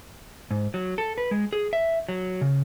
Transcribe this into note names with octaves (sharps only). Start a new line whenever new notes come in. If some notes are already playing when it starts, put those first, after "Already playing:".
G#2
F#3
A4
B4
G#3
G#4
E5
F#3
C#3